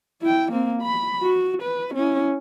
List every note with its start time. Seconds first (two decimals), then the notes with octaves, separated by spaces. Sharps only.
0.21 E4 G5
0.52 A#3 C4
0.81 B5
1.22 F#4
1.62 B4
1.94 C#4 E4